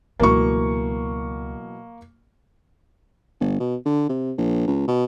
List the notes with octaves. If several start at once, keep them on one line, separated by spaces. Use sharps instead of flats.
C#2 B2 E3 F#3 A3 A#3 C#6
G1
B2
D3
C3
A#1
C#2
B2